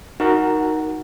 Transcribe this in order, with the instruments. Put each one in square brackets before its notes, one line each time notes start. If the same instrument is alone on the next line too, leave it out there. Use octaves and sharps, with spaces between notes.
[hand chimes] D#4 [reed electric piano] F#4 A#4 F#5